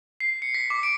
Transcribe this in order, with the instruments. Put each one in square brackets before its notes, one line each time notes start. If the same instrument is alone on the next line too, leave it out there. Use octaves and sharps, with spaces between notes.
[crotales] C7
C#7
B6
D6
D7